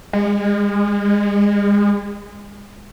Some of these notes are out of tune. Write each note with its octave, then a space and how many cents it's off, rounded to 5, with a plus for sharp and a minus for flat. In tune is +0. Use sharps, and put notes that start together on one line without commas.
G#3 -35